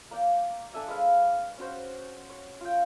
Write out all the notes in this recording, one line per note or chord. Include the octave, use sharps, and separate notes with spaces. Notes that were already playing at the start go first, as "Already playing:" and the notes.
A#3 D5 G5
D4 A4 E5 G#5
G#3 B4 F5
C#4 F#4 C5
C#5
F4 G5